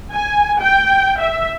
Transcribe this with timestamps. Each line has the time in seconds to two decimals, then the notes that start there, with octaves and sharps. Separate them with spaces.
0.12 G#5
0.60 G5
1.19 E5